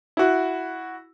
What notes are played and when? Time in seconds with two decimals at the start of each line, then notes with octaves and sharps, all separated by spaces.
0.17 E4 F#4